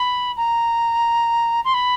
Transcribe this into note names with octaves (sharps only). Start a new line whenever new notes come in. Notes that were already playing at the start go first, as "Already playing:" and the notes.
Already playing: B5
A#5
C6
B5